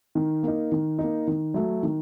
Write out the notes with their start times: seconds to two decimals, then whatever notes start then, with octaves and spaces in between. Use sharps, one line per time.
0.15 D#3
0.43 A#3 D#4
0.72 D#3
0.99 A#3 D#4
1.27 D#3
1.54 F#3 A3
1.83 D#3